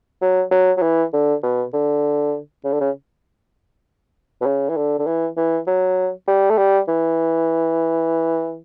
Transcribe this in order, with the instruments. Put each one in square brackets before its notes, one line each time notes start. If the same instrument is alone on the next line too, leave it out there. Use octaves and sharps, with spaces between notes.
[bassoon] F#3
F#3
F#3
E3
D3
B2
D3
C#3
D3
C#3
B2
C#3
E3
D3
D3
E3
E3
F#3
G3
A3
G3
E3